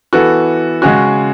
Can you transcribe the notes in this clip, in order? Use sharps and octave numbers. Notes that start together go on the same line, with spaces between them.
E3 B3 F#4 A4
C#3 G#3 C#4 F#4